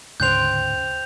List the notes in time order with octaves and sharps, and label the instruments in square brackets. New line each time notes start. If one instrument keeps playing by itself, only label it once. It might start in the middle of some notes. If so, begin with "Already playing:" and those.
[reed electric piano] D2 G#2 C#3 [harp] C5 G5 F#6 [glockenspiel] G6 F7